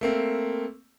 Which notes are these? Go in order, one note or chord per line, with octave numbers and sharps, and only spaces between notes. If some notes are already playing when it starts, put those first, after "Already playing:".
A3 A#3 C4